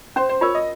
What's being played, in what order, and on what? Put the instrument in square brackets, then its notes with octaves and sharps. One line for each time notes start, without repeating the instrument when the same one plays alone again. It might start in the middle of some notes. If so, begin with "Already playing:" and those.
[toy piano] C#4 [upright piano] C5
[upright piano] C5
[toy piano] F4 A#4 [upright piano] C#5
[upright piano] D#5